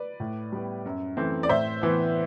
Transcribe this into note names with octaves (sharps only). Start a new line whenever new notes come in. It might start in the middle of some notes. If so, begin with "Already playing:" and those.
Already playing: B4 D5
A2
G3 B3
F#2
E3 A3 C4
D5
A2 C5 E5
E3 B3